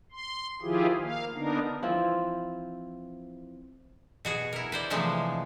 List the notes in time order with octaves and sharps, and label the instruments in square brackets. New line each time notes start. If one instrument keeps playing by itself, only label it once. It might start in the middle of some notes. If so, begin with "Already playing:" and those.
[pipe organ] C6
D#3 F3 E4 F4 G4 G#4
A#3 F5
D3 B3 D4 D#4 A#4
[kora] E3 F3 C4 E4
[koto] B2 F#4 G#4
E4 A#4
B4 C5 D5
C3 E3 F3 G#3 A3